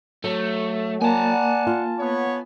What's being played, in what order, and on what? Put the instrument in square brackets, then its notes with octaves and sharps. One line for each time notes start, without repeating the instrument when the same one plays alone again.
[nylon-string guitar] F#3 [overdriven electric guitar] A3
[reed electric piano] A#3 [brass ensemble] D5 F#5 [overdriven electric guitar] G#5 A5
[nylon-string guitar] F4
[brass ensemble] B3 C#5